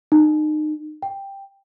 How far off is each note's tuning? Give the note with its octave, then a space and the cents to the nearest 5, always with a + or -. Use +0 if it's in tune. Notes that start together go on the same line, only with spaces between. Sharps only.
D#4 -30
G5 +5